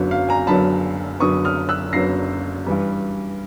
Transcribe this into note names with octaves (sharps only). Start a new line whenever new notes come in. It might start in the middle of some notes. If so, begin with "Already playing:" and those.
Already playing: F#1 F#2 D3 F#3 B3
F5
G#5 A#5
F#1 F#2 D3 F#3 B3 A5 B5
F#1 F#2 D3 F#3 B3 C#6 D#6
D#6 F6
E6 F#6
F#1 F#2 D3 F#3 B3 A#6 C7
G2 E3 G3